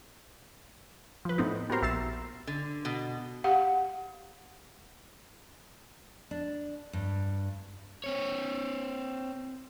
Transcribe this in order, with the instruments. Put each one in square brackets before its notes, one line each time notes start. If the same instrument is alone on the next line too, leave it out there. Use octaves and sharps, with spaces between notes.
[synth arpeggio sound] F3 B4
A2 B3 C4 D#4
B3 F#4 G4 A#4 C5
A#1 E5 A6 C7 E7
[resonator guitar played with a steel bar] D3
B2
[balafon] G4 F5 F#5
[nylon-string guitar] D4
G2
[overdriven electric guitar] C4 C#5